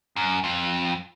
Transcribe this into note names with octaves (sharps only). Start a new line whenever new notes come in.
F#2
F2